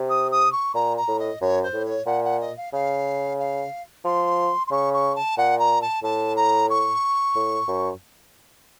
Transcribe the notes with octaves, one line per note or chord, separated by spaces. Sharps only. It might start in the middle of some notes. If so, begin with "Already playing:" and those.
Already playing: C3
D#6
D#6
C#6
A#2 A#5
A#5
A2
D#5
F#2 C#5
C5
A2
C#5
A#2 F#5
F#5
D#5
F5
C#3 F5
F5
F3 C6
C6
C#3 C#6
C#6
A5
A#2 F#5
A#5
A5
A2 A5
A#5
C#6
A2
F#2